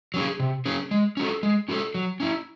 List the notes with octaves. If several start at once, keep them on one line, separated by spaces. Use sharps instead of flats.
F#3 C#4 G#4
C3
F#3 C#4 G#4
G#3
C#4 F#4 A4
G#3
C#4 F#4 A4
F#3
C#4 E4